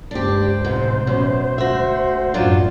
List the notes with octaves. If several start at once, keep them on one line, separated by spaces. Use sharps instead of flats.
C#2 G2 D4 G4 C5
A1 G#2 C3
F#2 B2
D2 F#4 E5
A1 F#2 F#3 D4 F4